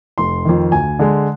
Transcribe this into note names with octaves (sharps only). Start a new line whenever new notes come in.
F1 C6
F2 D#3
D2 G#5
D3 G#3